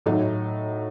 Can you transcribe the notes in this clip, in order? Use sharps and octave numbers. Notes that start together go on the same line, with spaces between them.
A2 F#3 D#4